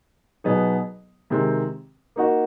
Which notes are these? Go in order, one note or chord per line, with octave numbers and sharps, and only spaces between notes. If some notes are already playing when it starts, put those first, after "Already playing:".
B2 F#3 B3 D#4 G#4
C3 D#3 G#3 C4
A#3 D#4 F#4